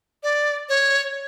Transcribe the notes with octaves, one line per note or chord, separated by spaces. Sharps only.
D5
C#5